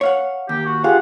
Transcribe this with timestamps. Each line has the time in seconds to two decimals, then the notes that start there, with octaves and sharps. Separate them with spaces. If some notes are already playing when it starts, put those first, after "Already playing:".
0.01 C#5 F5 F#5
0.49 D#2 G4
0.66 F#4
0.84 F4 G4 G#4 F5 F#5